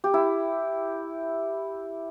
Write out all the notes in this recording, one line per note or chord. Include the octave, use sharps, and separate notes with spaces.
G4
E4